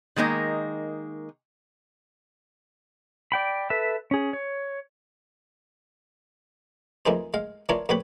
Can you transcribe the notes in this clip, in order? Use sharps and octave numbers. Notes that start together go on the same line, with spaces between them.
D#3 G#3 A#3 D#4
D5 G5 B5
A4 B4 E5
C#4 G#4
C#5
F2 E3 A#3 D#4 G#4 C5
G#3 F5
E3 D4 F4 A#4 C#5
F2 A#2 G4 B4 C#5 B5